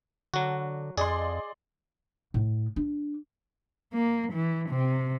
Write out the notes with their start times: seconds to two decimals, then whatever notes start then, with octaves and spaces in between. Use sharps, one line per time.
0.34 D3 F#3 F#4
0.97 F2 G#4 D5 D#5 C6
2.34 A2
2.76 D4
3.93 A#3
4.32 E3
4.69 C3